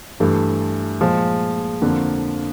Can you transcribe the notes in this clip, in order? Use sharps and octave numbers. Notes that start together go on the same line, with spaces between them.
G2 E3 A3
A#2 F3 G#3
F2 D3 F3 A#3